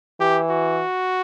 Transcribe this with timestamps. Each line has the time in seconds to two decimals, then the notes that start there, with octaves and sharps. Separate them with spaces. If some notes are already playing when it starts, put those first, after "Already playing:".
0.20 E3 G4
0.50 F#4